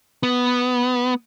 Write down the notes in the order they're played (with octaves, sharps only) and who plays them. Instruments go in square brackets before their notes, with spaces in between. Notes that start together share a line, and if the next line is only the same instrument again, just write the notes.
[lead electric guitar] B3